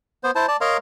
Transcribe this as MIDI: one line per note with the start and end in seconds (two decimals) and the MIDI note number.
0.24 0.31 59
0.24 0.31 72
0.35 0.46 64
0.35 0.46 72
0.35 0.46 81
0.48 0.57 74
0.48 0.57 81
0.61 0.77 70
0.61 0.77 73
0.61 0.77 75
0.61 0.77 77
0.61 0.77 82
0.61 0.77 84